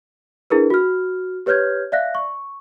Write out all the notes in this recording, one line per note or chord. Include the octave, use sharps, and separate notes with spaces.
D4 E4 G#4 A#4 B4
F#4 F6
G4 B4 C#5 F6 G6 G#6
D5 E5 F5 F#6 A#6
C#6